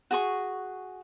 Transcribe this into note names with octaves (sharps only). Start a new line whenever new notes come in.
F#4 G#4 C#6